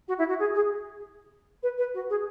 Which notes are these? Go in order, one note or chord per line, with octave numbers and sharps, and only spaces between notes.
F#4
E4
F#4
G#4
G#4
B4
B4
F#4
G#4